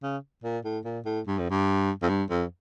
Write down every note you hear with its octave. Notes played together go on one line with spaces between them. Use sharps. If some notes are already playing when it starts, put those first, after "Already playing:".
C#3
A#2
A2
A#2
A2
G2
F2
G2
F2
G2
F2